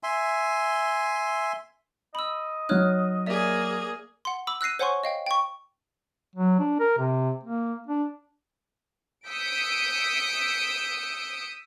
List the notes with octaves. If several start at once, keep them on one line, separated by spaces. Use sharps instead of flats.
E5 G#5 C6
D#5 B5 E6
F#3 D#4 C#5 F6 F#6
A#3 G#4 D5 E5
F#5 C6
B5 D6 E6
E6 F#6 A#6 C7 D#7
C5 C#5 F#5 G#5 C6 C#6
D#5 F5 G5
G5 C#6
F#3
D4
A#4
C3
A#3
D4
D#6 E6 G6 B6 C#7 D7